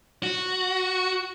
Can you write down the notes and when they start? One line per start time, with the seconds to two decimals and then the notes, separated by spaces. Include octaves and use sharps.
0.23 F#4